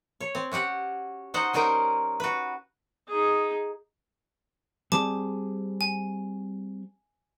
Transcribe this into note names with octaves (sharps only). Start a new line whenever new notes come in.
C#5
C4
C#4 F#4 G4 F#5
D#4 F#4 C5 D#5 F#5
G3 C#4 D#4 A#4 C5 G5
F#4 B4
D#4 G#4
G3 C4 G#4 A5 D6
G#5